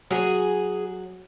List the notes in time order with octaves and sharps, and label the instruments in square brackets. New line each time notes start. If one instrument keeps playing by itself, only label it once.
[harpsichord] F#3 C#5 [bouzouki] G#4